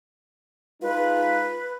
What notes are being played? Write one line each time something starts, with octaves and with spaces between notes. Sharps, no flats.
G#3 D#4 F4 B4